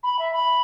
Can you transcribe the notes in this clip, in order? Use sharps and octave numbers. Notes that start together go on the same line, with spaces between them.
B5
E5
B5